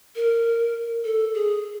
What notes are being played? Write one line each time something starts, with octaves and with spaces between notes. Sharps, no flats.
A#4
A4
G#4